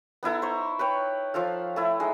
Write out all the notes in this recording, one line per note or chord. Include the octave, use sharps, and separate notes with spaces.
B3 D#4 E4 A4
C5 A#5 C#6
B4 C#5 G5
F3 F4 A4 F5
A3 E4
G#3 D#4